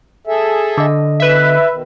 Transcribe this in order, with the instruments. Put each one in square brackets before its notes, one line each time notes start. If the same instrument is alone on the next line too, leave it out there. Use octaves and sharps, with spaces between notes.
[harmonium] G#4 A4 E5
[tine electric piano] D3 D#5
[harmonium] B2 [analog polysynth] B4 E5
[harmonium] B2 D#3